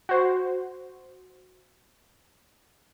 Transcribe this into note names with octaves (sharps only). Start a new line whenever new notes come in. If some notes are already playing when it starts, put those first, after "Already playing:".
F#4 C5